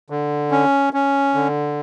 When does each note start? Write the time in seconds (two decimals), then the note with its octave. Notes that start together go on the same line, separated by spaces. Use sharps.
0.10 D3
0.51 C#4
0.93 C#4
1.34 D3